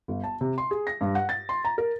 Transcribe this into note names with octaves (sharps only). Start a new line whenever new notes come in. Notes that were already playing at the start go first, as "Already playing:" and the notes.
G1
A5
C3
C6
G#4
A#6
G2
F#5
A6
C6
A#5
A#4